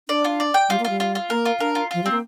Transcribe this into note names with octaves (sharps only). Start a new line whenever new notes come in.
D4 D5
F4
D5
G5
G3 F4
A#3
G3 F4
F4
F4
A#3 A#4
F4
D4 A#4
F4
F3 F4
G3 C4
A#3